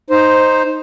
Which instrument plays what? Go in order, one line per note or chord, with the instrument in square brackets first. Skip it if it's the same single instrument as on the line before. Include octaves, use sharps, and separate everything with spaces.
[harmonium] D#4 C5